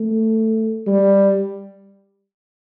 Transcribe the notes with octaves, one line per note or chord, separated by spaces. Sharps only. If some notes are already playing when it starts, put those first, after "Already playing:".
Already playing: A3
G3